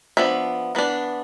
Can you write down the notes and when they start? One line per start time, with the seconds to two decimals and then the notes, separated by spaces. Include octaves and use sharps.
0.17 F3 B3 D4 E5
0.75 E3 B3 D4